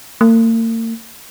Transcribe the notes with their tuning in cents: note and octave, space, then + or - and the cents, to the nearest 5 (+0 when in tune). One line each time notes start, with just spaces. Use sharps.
A#3 -45